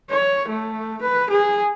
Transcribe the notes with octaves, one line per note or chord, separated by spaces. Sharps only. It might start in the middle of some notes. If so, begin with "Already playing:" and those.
C#5
A3
B4
G#4